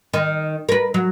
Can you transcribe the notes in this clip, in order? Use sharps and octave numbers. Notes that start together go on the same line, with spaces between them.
D#3
A#4 B4
F#3